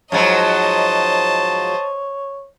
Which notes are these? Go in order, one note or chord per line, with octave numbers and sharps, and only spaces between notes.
G#2 F3 F#3 C5 C#5 D#5 A5